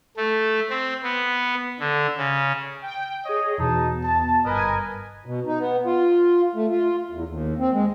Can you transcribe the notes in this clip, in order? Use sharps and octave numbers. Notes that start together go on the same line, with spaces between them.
A3
C4
B3
D3
C#3
G5
G#4 C#5 D#5
E2 B2 D#4 A5 D#6
A5
G1 A#4 B4 D#5 G#5
B2
D#4
B3
F4
A3
F4
E2
D#2
C4
G#3